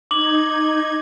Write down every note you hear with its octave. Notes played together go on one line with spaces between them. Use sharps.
D#4 D6 G#6 F#7